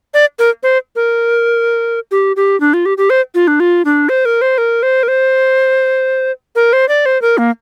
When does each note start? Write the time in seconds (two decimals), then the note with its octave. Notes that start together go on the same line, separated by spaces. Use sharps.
0.14 D5
0.39 A#4
0.63 C5
0.96 A#4
2.11 G4
2.36 G4
2.60 D4
2.74 F4
2.86 G4
2.98 G4
3.10 C5
3.35 F4
3.48 D4
3.60 F4
3.85 D4
4.09 C5
4.25 A#4
4.42 C5
4.58 A#4
4.83 C5
5.03 A#4
5.08 C5
6.55 A#4
6.73 C5
6.89 D5
7.06 C5
7.22 A#4
7.38 A#3